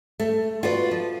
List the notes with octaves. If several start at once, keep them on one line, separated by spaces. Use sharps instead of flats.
A3
F4 F#4 B4 D5
F3